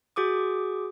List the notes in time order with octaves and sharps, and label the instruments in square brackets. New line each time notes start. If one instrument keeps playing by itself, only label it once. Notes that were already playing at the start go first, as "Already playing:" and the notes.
[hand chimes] F#4 G#4 D6 D#6